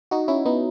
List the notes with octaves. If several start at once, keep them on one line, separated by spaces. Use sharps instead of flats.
D#4 F#4
C#4 E4
B3 D#4